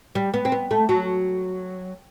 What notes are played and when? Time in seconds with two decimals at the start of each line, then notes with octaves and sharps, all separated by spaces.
0.15 G3
0.34 B3
0.45 C4
0.52 B3
0.71 A3
0.89 F#3